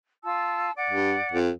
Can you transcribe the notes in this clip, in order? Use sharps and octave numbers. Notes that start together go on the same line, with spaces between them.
F4 A5 E6
D5 F#5
G2
F2